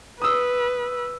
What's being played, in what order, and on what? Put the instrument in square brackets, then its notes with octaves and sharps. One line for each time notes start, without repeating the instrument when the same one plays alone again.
[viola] B4 [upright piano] D#6 E6